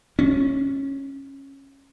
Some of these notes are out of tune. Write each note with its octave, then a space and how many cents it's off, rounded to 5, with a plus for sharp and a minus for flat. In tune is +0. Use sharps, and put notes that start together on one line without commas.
C#4 -15